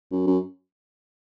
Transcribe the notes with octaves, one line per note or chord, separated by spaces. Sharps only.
F#2
F#2